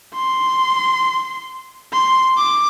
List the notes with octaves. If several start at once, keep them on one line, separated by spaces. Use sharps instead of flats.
C6
C6
D6